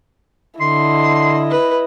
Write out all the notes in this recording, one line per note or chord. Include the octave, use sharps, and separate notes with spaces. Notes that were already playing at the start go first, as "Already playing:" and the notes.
D3 E4 D#5 C6
B4